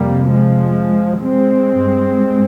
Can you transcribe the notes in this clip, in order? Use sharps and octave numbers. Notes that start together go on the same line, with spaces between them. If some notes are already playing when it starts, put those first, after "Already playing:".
Already playing: F2 C3 G3 A#3
F3 G#3
G#3 C4
G2